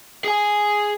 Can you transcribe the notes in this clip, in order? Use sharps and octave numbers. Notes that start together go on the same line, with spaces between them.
G#4 G#5